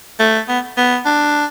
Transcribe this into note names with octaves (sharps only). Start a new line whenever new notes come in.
A3
B3
B3
D4